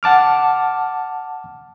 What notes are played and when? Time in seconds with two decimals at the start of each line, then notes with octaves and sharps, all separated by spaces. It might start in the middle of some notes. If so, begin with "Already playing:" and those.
0.03 F#5 A5 D6 F6